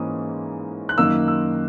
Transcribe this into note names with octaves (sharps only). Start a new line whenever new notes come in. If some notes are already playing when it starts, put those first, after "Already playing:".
Already playing: G#2 E3 A#3 C#4 D#6
F#6
F#2 D#3 A#3 E6
E6